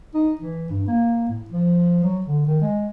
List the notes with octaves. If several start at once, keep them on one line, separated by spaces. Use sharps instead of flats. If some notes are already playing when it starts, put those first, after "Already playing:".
D#4
E3
G2
A#3
A2
F3
F#3
D3
D#3
G#3